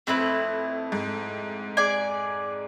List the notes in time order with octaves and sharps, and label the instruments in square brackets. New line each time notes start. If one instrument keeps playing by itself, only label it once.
[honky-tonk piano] F2 [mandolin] A3 C4 E4 B4
[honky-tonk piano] G#2
[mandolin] G#4 D5 G#5